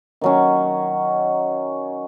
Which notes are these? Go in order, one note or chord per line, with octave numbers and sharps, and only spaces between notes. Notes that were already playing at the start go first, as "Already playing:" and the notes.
D#3 F#3 C#4